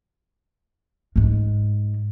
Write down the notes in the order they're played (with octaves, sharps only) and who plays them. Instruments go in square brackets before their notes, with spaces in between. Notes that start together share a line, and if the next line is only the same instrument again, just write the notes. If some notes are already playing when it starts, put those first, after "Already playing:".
[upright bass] G#2 G#3